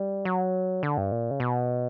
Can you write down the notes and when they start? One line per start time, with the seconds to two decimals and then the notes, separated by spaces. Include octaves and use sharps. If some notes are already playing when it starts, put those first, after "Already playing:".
Already playing: G3
0.25 F#3
0.83 D3
0.98 G2
1.12 A#2
1.31 C#3
1.40 B2